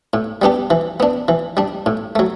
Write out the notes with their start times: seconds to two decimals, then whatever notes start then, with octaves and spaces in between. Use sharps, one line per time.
0.14 A2
0.42 G3 B3 D4 G4
0.70 E3
1.00 B3 D4
1.28 E3
1.57 G3 D4
1.86 A2
2.16 F#3 A3